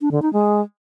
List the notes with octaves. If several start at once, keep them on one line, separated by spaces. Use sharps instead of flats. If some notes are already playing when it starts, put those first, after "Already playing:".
D4
D3
D#4
G#3